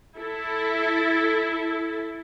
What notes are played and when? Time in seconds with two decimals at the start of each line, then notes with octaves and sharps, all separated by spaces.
0.17 E4 A4